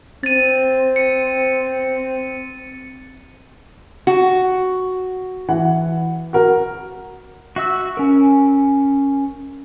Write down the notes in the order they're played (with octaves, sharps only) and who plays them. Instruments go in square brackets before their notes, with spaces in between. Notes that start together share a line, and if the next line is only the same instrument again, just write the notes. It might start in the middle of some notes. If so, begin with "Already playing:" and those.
[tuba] C4 [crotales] A6 D#7
[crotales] C#7
[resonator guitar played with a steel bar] F#4
[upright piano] E3 F#5
F#4 A#4
[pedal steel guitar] F#4 E5 E6
C#4 A#4